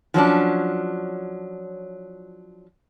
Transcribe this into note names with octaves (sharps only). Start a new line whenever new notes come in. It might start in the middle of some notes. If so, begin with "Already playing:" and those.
F3 F#3 C#4 D4